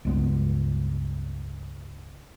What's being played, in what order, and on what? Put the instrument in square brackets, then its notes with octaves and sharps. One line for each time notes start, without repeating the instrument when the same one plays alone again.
[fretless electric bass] C#2 G2 G#3 B3